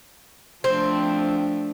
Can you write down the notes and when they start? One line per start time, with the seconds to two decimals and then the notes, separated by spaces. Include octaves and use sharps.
0.64 F3 A3 C4 D4